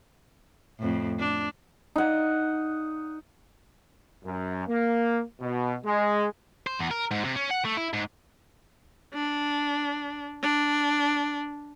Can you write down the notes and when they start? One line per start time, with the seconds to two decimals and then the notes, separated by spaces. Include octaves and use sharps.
0.79 F2 A2
1.20 D4
1.96 D#4 F#5
4.25 F#2
4.68 A#3
5.40 B2
5.84 G#3
6.67 C5
6.79 E2
6.91 A#4
7.11 G#2
7.24 C3
7.36 C#4
7.50 F#5
7.65 A3
7.77 E4
7.93 G#2
9.14 D4
10.43 D4